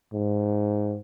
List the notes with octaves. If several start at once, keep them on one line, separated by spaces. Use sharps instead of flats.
G#2